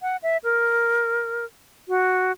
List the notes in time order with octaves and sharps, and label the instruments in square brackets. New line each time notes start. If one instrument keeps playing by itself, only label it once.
[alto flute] F#5
E5
A#4
F#4